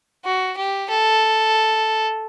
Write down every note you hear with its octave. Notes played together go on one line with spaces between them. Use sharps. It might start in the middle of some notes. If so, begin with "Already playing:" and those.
F#4
G4
A4